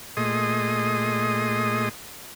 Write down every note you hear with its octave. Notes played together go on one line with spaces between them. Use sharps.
A#2 A3 G#4 D#5 C6 D#6